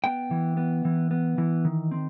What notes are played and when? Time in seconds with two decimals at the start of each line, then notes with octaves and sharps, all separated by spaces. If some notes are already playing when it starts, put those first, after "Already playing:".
0.04 B3 G5
0.31 E3
0.57 B3
0.85 E3
1.11 B3
1.38 E3
1.65 D#3
1.91 C4